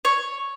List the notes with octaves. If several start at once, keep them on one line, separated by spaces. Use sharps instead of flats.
C#5